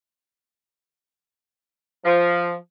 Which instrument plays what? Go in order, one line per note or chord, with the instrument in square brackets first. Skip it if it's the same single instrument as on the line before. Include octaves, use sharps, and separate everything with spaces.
[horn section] F3